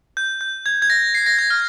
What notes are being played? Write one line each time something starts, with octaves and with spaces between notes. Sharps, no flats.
G6
G6
G#6
G#6
A#6
C7
A#6
G#6
F6